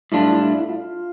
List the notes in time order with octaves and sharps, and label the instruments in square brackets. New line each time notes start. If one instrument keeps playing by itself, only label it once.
[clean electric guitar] A2 G3 D4 F4 [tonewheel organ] E4
[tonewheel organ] E4
E4
F4